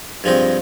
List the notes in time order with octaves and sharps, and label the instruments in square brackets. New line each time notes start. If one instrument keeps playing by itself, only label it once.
[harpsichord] G2 F3 G#3 C4